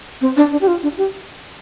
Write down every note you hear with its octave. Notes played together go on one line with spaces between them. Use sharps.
C4
D4
D4
G4
F4
D4
G4